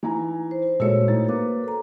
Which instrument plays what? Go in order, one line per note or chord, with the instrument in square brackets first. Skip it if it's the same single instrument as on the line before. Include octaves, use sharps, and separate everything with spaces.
[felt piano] E3 G#5 A#5 [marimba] D#4
[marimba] C5
[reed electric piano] A#2 G#3 A3 [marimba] F#4 A#4 C#5 [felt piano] E6 C#7
[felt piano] A2 D#4 A6
[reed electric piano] A#3 [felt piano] B4 [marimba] A#5 D6
[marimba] A4 A#5